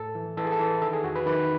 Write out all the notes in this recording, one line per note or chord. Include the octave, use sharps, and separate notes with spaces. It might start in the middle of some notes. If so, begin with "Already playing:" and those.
Already playing: A2 A4
E3
E3 A4
G#4
A4
E3
D#3 A4
G#4
E2 F#4
B4
D#3 B4